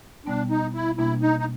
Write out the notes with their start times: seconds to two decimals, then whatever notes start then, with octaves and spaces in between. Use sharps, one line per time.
0.26 B2 G3 B3 D4
0.50 D#4
0.74 E4
0.98 B2 G3 A#3 D4 E4
1.21 D#4
1.39 D#4